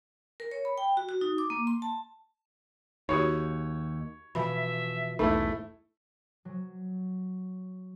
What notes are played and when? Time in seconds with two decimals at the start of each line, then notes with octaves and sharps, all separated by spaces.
0.40 A#4
0.51 C#5
0.65 B5
0.78 G5
0.97 F#4
1.09 F#4
1.21 D#4
1.38 D6
1.50 A#3
1.67 C6
1.82 A5
3.09 D#2 D#4 F#4 G4 C#5
4.35 B2 E3 F3 E5 B5
5.19 B1 E2 G#2 A3 D#4 E4
6.45 F#3